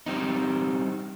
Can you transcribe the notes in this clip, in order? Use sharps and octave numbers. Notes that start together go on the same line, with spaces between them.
G3 C4 D#4